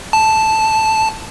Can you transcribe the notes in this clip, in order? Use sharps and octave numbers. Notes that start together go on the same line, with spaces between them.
A5